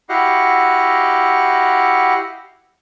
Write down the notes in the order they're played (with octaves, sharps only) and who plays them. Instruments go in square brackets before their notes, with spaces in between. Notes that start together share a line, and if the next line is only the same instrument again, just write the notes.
[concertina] E4 F#4 G4 D#5 F5 F#5